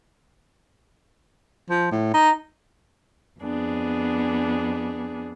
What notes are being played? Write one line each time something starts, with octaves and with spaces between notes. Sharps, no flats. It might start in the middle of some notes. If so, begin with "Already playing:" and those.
F3
A2
D#4
F2 B3 D4 G#4